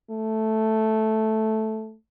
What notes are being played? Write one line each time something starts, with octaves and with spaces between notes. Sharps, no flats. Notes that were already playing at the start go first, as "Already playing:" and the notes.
A3